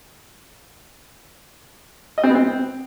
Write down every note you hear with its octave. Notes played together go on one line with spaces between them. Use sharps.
D#5
C4
B3
C4